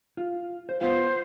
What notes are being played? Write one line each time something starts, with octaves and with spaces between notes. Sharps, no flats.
F4
C5
B3 F4 C5 F5